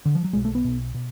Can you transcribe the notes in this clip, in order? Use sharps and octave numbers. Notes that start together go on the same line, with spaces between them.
D3
F3
F#3
B1 B2 G#3
A3
B3
B1 B2
B2